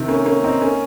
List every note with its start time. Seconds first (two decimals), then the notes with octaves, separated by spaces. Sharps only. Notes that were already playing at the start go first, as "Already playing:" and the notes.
Already playing: C3 D#3
0.08 A#3 C#4
0.26 A#3 C#4
0.44 C4 D#4
0.61 A#3 C#4